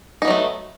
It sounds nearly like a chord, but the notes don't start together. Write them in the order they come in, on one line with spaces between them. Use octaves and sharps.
D#4 B3 F#3 A3